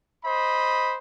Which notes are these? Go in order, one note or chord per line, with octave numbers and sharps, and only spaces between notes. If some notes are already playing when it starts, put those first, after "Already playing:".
C5 D#5 B5